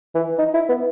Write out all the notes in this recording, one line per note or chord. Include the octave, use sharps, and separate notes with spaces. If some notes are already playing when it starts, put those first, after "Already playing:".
E3
D#4
E4
B3